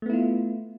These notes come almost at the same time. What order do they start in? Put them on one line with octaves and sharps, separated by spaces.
A3 B3 E4 F4